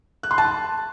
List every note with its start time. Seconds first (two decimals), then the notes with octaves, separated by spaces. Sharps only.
0.23 F#6
0.31 C6
0.38 A5